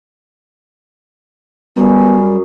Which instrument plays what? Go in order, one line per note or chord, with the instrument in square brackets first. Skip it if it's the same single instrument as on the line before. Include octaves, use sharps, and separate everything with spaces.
[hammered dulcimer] F#2 G#4 [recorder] G3 [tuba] B3